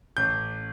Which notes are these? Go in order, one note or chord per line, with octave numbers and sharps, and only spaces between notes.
A1 G6